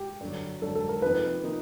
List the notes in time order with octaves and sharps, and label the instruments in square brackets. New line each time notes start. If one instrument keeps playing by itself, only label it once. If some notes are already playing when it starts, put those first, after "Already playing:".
Already playing: [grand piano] G4
[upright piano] G2 D3 F#3
[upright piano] G2 D3 F#3 [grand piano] A4
[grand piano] A4
A#4
[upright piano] C3 F3 A#3 D#4 [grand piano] B4
[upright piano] C3 F3 A#3 D#4